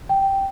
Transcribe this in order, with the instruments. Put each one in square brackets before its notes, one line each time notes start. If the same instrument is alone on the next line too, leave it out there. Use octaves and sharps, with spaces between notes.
[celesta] G5